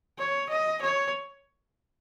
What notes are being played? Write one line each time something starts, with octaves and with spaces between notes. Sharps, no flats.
C#5
D#5
C#5